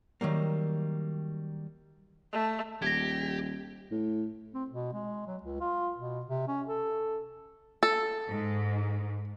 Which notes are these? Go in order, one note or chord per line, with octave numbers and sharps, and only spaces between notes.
D#3 F#3 G3 A#3
A3
D#1 G4 G#6 A#6
A2
C4
B2
G#3
F#3
C#2
F4
B2
C3
C#4
A4
A4
G#2